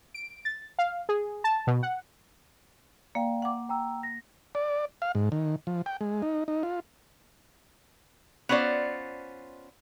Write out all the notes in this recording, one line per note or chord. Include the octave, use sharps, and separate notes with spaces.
D7
A6
F5
G#4
A5
B2
F#5
A#3 D5 F5 G5
F#5 D6
G5 A#5 E6
A#6
D5
F5
G#2
D#3
F3
G5
G#3
D#4
D#4
F4
B3 C#4 F4 C5 D5